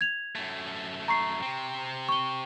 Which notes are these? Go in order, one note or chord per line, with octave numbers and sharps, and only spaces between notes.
G#6 F7
F#2 A3
A#5 C#6 C7
C3 C4
C#6 G7